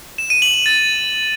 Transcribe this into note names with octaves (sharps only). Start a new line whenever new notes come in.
E7
D#7
F#7
F#7
A6